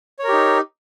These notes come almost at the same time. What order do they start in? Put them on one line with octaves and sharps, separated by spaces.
C#5 A#4 G4 D#4